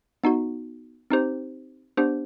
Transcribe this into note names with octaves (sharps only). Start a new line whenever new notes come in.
B3 D#4 F#4
C4 D#4 G4 C5
B3 D4 G4 C5